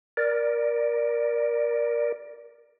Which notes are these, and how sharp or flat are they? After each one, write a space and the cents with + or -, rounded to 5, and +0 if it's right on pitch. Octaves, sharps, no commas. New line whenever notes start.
A#4 +15 D5 +0